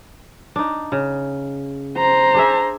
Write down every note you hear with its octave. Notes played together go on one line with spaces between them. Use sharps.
D4 D#4
C#3
C5 A#5
D4 G#4 E5